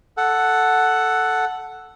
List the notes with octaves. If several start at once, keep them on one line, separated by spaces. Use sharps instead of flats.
A4 F#5